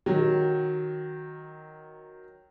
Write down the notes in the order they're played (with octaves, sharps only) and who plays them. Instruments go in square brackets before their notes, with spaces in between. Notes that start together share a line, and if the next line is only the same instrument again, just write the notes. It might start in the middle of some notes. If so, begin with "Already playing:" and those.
[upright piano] D#3 F#3